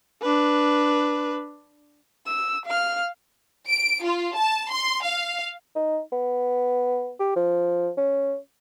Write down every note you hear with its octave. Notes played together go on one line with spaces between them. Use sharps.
D4 B4
E6
F5 F6
D7
F4
A5
C6
F5
D#4
B3
G4
F3
C#4